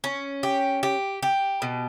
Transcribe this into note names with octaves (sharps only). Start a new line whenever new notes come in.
C#4
G4
G4
G4
B2